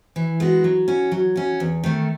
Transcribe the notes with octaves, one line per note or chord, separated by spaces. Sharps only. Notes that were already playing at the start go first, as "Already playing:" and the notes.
E3
G#3 B3 F#4
F#3
C#4 F#4
F#3
C#4 F#4
E2
D#3 A3